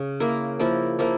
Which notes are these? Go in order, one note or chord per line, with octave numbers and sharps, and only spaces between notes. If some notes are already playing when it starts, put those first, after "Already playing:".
Already playing: C#3
A#3 E4 A#4
F3 A#3 E4 A#4
F3 A#3 E4 A#4